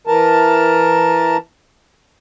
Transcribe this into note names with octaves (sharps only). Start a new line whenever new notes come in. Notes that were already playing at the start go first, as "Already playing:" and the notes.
E3 A#4 A5